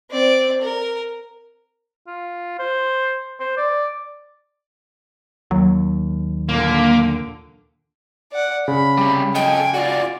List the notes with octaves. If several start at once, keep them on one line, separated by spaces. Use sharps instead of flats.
C4 D5
A#4
F4
C5
C5
D5
D#2 F#3
A#2 D3 A#3
D5 F#5
C#3 B5
C3 G3
A4 D#5 G5 G#5
F4 F#4 D5